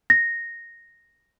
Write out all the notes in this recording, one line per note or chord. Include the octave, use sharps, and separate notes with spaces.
A#6